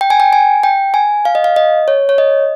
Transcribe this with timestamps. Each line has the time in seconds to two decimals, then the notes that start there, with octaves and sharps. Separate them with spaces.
0.01 G5
0.10 G#5
0.20 G5
0.33 G#5
0.63 G5
0.94 G#5
1.25 F5
1.35 D#5
1.44 F5
1.56 D#5
1.88 C#5
2.09 C#5
2.18 D#5